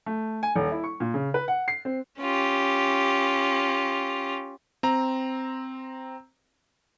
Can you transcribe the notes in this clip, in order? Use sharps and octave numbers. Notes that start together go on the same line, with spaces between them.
A3
G#5
D#1
E4
C#6
A#2
C#3
B4
F#5
C7
C4
C#4 F4 G4
C4 A#5